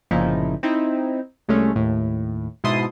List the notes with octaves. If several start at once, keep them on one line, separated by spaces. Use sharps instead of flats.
G1 A#2 C#3 F3 D#4 E4
C4 D#4 E4
C2 G#3 A3 C#4
D#2 A2
G#2 B2 E4 A5 C6 D#6